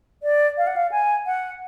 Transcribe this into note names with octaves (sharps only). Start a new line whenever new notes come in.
D5
F5
F#5
F5
G#5
F#5